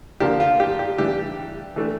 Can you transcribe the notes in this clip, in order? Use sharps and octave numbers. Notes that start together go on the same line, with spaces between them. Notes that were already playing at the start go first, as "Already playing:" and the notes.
D3 F3 A#3 D4 G4
F4
G4
G4
E3 G3 D4 G4
E3 A3 D4